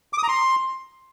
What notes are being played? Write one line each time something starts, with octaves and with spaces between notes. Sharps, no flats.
D6
D#6
A#5
C6